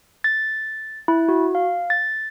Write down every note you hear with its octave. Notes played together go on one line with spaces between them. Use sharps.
A6
E4
F#4
F5
A6